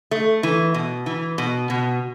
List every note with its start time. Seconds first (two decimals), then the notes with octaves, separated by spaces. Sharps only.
0.11 A3
0.43 E3
0.74 B2
1.06 E3
1.38 B2
1.70 B2